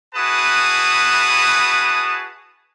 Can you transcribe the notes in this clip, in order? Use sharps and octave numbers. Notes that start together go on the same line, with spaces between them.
E4 F#4 G#4 B4 A5 D#6